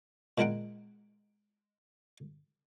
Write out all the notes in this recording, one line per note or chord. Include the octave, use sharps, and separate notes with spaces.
A#2 G#3 E4 A#4 F#5 G5